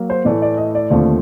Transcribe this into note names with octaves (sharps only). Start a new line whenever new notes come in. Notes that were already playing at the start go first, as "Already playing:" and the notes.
Already playing: F#3 A#3
C5
A2 E3 A3 D5
D5
D#5
D5
D#2 D3 F3 A3 C4 D5